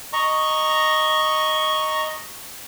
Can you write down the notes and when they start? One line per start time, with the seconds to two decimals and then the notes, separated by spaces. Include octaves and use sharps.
0.13 D#5 A#5 C#6